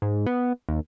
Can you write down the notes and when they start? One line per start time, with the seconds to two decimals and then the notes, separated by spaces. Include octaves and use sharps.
0.02 G#2
0.26 B3
0.69 D#2